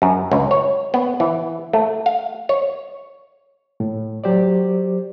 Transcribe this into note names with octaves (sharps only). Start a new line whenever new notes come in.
F#2
C#2
C#5
B3
E3
A3
F5
C#5
A2
F#3 G4 C5 D5